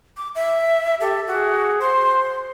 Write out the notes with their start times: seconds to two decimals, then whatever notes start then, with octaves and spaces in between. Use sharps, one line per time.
0.17 D6
0.35 E5
1.00 G4 A4
1.27 F#4 G#4
1.81 C5 C6